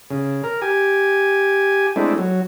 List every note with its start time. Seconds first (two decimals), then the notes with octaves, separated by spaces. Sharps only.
0.10 C#3
0.44 A#4
0.62 G4 G#5
1.96 G#3 A3 C4 D4 E4
2.18 F#3